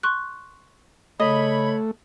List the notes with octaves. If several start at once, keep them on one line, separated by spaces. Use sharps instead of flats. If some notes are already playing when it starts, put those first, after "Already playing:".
C6 C#6 F#6
C#3 A3 C#5 D#5 B5 D#6